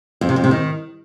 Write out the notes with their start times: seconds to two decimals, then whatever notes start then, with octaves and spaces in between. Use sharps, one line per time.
0.21 F2
0.29 C3
0.36 F2
0.44 C3
0.51 D#3